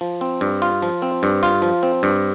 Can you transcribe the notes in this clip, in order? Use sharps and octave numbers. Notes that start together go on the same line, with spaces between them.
F3
C4
G2
F4
F3
C4
G2
F4
F3
C4
G2